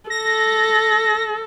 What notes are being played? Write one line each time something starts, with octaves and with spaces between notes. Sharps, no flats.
A4 A#6